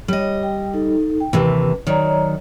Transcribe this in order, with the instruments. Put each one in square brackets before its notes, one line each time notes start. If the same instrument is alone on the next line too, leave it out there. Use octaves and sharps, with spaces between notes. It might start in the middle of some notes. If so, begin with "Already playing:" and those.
[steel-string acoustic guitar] G3 D#5 [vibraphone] C#5
[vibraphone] G5
D#4 A4
G5
[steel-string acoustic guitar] D#2 C3 E3 [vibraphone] B4
[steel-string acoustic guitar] D#3 F#3 [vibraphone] C#5 D5 A#5